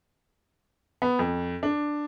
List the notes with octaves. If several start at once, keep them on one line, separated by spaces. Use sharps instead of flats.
B3
F2
D4